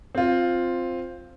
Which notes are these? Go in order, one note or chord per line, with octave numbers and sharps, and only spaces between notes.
C4 F4